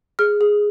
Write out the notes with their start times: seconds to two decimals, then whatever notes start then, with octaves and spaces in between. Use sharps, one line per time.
0.19 G#4 F6
0.41 G#4